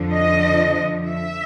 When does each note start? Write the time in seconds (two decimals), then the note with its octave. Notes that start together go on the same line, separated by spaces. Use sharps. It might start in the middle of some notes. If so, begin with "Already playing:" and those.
Already playing: F2 D3 F3
0.12 D#5
1.07 E5